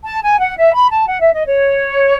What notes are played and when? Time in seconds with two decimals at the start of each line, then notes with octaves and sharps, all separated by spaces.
0.04 A5
0.22 G#5
0.39 F#5
0.56 E5
0.72 B5
0.90 A5
1.07 F#5
1.20 E5
1.33 D#5
1.45 C#5